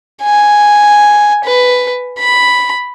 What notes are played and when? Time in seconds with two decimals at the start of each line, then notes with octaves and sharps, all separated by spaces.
0.22 G#5
1.44 B4
2.19 B5